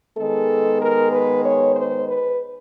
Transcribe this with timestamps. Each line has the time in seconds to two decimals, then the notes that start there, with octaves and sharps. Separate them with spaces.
0.16 D#3 G#3 B3 A4
0.80 A#4
1.11 B4
1.43 C#5
1.75 C5
2.06 B4